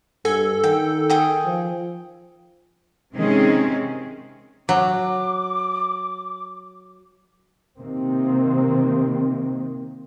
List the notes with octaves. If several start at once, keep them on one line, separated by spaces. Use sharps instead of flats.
G2 A4 G#5
D#3 G5
G#4 G5 D#6
F3
C3 D#3 G#3 C4 C#4 G#4
F#3 D6
C3 D#3 A#3 C4